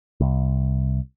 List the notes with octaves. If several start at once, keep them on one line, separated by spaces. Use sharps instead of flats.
C2